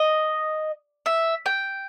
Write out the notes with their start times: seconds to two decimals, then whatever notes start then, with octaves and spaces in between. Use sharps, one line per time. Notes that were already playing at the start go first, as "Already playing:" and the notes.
Already playing: D#5
1.06 E5
1.46 G5